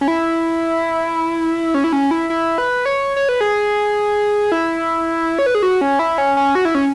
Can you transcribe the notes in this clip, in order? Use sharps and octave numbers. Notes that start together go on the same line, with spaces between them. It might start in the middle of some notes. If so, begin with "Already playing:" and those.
C#4
E4
C#4
E4
C#4
E4
E4
B4
C#5
C#5
B4
G#4
E4
C#5
B4
G#4
F#4
C#4
E4
C#4
C#4
F#4
E4
C#4